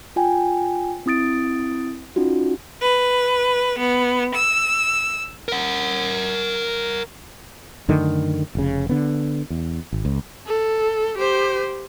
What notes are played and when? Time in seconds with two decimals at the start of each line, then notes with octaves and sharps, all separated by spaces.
0.16 F4 G5 G#5
1.06 C4 E4 D#6 A6 D7
2.16 C#4 D#4 F4 F#4
2.82 B4
3.77 B3
4.34 E6
5.48 A#4 F#5
7.88 F#2 D3 D#3 A3
8.55 F1 C#3
8.89 D3 B3
9.50 E2
9.92 G#1
10.05 C#2
10.47 A4
11.18 G4 C5